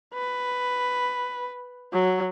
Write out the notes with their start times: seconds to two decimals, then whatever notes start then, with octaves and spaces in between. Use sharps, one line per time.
0.14 B4
1.93 F#3